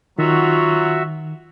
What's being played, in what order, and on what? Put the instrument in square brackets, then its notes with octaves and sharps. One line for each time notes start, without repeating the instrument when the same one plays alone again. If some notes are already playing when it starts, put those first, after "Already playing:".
[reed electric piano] D#3 [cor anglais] F#3 [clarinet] F4 [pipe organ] F#4 E5